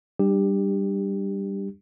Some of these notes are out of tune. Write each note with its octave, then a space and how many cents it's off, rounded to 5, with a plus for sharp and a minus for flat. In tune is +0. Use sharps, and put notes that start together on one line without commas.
G3 +0 D4 +25 G4 +15